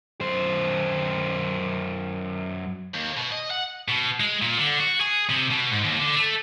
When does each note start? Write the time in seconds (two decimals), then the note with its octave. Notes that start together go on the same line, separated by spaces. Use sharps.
0.21 F#2 C5
2.94 D#2
3.17 B2
3.31 D#5
3.50 F#5
3.88 B2
4.20 G#3
4.42 A#2
4.58 D3
4.80 F#4
5.01 G#4
5.29 C3
5.50 B2
5.71 G#2
5.84 D#2
6.00 D3
6.15 A3